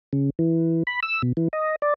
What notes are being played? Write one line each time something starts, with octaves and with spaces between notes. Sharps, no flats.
C#3
E3
B5
E6
B2
E3
D#5
D5